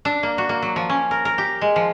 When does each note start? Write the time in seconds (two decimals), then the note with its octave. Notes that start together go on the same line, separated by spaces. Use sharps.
0.05 D4
0.23 A#3
0.38 F#4
0.49 A#3
0.62 F#3
0.76 F3
0.89 C#4
1.11 A#4
1.25 A#4
1.38 G4
1.61 G#3
1.76 F3